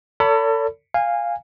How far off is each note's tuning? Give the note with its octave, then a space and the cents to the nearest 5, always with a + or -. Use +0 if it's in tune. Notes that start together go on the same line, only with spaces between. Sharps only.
A4 +35 C#5 +45 B5 +0
F5 +0 G#5 -20